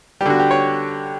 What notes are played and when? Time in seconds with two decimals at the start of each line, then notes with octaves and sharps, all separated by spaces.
0.21 G3 G4
0.26 D3 F#4
0.40 G4
0.51 C#5